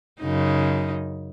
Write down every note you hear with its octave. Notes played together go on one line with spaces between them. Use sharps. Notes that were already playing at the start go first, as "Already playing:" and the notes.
F#2 C#3 D#4